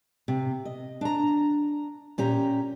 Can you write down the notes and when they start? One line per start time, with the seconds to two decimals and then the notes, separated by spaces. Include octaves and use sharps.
0.28 C3
0.65 D#5
1.01 D4 A#5
2.18 A#2 C#4 G4 A#5